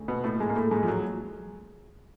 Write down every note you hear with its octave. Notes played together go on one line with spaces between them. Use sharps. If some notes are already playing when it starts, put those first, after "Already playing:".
Already playing: D2 C#3
B2 B3
A2 A3
G#2 G#3
A#3
A2 A3
G#2 G#3
F3
F#3